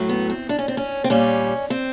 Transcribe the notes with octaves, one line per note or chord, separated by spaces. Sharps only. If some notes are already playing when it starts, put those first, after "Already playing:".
Already playing: A2 F#3 A3
B3
C4
D4
C#4
C4
C#4
C4
A#2 G3 C#4
C4